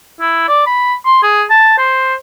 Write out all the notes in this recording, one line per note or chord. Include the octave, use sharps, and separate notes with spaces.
E4
D5
B5
C6
G#4
A5
C5